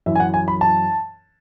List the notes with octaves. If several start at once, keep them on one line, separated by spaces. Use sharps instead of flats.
F#2 E3 E5
G#5
F#5
G#5
B5
A5